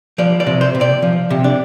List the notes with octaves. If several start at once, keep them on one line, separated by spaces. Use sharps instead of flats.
F3 D5
D5
C3
C5
C3
D5
F3
C3
D4